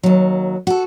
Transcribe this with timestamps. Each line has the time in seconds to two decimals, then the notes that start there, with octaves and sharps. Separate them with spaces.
0.03 D#2 F#3
0.67 F#4 A4